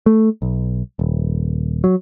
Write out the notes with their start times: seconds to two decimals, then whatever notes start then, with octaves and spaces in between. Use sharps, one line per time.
0.06 A3
0.42 B1
0.99 D#1
1.84 F#3